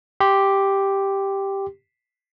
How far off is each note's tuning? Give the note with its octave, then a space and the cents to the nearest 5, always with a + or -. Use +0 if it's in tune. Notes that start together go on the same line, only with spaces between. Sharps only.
G4 +0 C6 +0